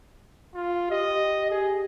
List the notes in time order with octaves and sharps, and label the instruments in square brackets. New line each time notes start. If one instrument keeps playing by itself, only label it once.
[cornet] F4
[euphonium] G4 [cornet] D#5
[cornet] G#4